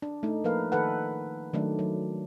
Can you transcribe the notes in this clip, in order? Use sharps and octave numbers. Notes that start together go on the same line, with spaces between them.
D4
A3 D#4
F3 A#3 A#4 B4 F5
D#3 A4 B4 F#5
D#3 F#3 A3 D4
F#3